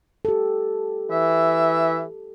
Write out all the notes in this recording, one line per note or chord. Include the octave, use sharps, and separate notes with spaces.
G4 A4
E3 E5